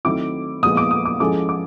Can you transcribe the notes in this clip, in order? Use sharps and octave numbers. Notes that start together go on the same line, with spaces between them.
D#3 F#3 A3 C4 E4 D6
A#2 F3 G#3 B3 D#6
D6
D#6
D6
F3 G#3 C#4 E4 A4 D6
D6